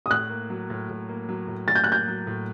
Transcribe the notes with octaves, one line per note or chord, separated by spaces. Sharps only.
D#6
A2 F#6
A#3
F#3
A2
A2
A#3
F#3
A2
A2 A6
G6
F#6
A#3 G6
F#3
A2